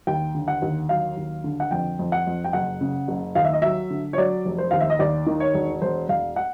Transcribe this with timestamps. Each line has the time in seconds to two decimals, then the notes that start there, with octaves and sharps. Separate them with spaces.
0.07 D#2 G5
0.35 D3
0.48 F#5
0.62 D#2
0.89 F#3 F5
1.17 D#2
1.44 D3
1.60 F#5
1.71 F2 G5
1.99 F2
2.12 F#5
2.27 F2
2.44 G5
2.53 F#1 F#5
2.81 C#3
3.08 F#1
3.35 D#2 F5
3.45 E5
3.53 D#5
3.62 F#3 E5
3.90 D3
4.13 C#5
4.18 F#3 D5
4.45 F1
4.58 C5
4.71 D#2 F5
4.80 E5
4.90 D#5
4.99 D#2 D5
5.27 D#3
5.40 C#5
5.54 E1
5.82 E1 C5
6.09 E1 F5
6.36 F#5